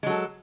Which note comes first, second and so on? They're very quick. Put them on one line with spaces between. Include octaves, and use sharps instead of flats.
G#3 F#3 A4